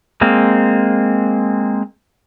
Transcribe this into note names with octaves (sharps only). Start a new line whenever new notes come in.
G#3 A#3 C4